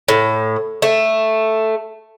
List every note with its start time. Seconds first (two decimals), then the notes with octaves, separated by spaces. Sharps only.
0.08 A2
0.82 A3